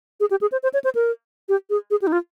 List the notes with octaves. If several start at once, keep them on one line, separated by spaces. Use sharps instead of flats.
G#4
G4
G#4
C5
C5
C#5
C5
A#4
G4
G#4
G#4
G4
D#4
F4